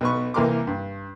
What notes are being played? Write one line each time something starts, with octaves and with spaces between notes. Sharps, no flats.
B1 B3 B4 C#6
C2 E3 A#3 A#4 C6 D6
G2